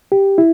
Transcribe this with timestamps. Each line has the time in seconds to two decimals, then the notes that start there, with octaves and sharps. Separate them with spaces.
0.12 G4
0.38 E4